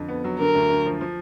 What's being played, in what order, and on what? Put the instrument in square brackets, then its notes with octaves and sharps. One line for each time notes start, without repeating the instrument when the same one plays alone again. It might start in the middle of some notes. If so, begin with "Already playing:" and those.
Already playing: [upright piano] F2 D3
B3
F#3
[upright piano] D3 [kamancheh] A#4
[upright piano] D2
D2
F3
F3